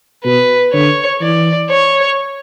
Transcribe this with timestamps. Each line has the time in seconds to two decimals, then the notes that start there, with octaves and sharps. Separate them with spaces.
0.25 B2 B4
0.73 D3 C#5
1.21 E3 D5
1.70 C#5